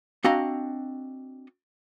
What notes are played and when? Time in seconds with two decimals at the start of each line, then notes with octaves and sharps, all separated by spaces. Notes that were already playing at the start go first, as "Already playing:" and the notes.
0.24 C4 D4 F#4 D#5 F5 A#5